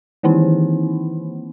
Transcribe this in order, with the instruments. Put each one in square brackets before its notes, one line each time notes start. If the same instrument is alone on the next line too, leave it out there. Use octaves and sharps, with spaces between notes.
[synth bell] D#3 E3 A#3 C4 D#4 E4